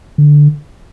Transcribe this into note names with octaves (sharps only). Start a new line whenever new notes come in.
D3